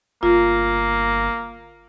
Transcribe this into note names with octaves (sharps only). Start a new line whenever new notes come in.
G1 A#3 F4